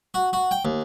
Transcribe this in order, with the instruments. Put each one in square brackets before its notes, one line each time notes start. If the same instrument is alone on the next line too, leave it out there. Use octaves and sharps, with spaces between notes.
[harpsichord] F#4
F#4
G5
D#2